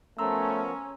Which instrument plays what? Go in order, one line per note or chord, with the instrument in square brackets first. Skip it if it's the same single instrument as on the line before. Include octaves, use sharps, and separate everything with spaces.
[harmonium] F3 B3 A#4 [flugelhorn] A3 [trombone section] C#4 [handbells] A#5 C6 E6